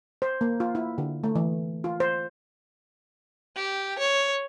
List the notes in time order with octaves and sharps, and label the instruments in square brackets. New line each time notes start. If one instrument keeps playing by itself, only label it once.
[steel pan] C5
A#3
F4
E4
D3
A3
E3
F4
C5
[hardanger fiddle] G4
C#5